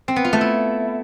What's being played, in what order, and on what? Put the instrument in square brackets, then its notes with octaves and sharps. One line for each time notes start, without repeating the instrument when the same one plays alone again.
[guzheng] C4
B3
F4
A3
E4